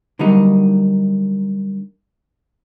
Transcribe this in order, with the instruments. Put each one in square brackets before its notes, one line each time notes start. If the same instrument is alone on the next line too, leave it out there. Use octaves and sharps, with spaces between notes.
[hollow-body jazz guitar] D3 F#3 G3 A#3 D#4